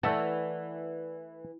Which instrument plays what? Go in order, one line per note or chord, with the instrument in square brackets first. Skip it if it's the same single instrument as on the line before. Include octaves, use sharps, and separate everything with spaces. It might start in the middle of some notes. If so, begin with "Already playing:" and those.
[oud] E3 [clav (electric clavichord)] A3 E5 A5 [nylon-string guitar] D5 F#5